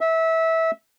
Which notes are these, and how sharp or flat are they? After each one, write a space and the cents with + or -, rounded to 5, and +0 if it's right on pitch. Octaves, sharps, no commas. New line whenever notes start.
E5 -20